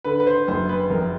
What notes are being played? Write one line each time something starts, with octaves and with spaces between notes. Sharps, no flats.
D3 B4
B4
C5
F#1 C5
B4
F2 A#4